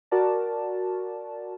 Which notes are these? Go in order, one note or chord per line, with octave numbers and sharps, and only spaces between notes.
F#4 A#4 D5 A5